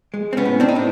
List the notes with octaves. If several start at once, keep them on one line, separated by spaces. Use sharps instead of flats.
G#3
C4
B3 C#4
A2
C4 D4
D#4
A2 D4